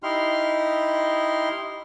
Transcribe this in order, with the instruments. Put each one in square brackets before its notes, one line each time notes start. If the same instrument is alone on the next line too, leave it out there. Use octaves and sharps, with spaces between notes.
[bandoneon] D#4 E4 G4 C6 F6